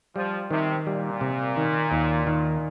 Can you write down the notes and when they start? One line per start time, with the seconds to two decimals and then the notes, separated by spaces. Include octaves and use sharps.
0.16 F3 G3
0.51 C3 D#3
0.86 A#2 G3
1.21 C3
1.57 D#3
1.91 D#2
2.27 D#3